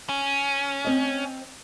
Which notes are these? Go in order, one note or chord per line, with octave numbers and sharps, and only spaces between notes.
C#4
C4 D#5